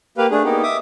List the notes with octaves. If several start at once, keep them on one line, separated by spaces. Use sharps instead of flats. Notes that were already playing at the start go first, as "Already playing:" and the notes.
A#3 G4 B4 F5
A3 D4 G#4
A#3 B3 D#4 G4
E5 D6 D#6